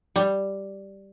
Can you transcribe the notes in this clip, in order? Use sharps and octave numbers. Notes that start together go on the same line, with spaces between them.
G3